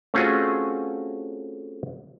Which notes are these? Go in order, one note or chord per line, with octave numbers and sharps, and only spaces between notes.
A3 C4 C#4 F4 F#4 G#4